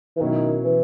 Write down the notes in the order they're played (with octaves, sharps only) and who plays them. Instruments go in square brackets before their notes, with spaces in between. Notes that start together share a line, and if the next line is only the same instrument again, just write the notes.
[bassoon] E3
[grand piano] B2 F#3 C#4 E4 [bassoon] D#3
[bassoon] E3